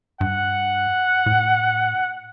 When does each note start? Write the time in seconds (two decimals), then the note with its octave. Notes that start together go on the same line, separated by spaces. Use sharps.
0.21 G2 F#5
1.26 A2